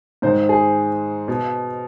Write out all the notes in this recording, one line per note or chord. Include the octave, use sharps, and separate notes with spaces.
G#2 D#3 C5
G#4
B2